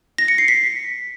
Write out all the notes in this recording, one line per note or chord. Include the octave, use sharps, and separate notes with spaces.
A#6
C#7
C7
B6